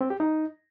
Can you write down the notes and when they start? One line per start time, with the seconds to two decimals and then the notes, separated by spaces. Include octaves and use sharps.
0.01 C4
0.10 G4
0.20 D#4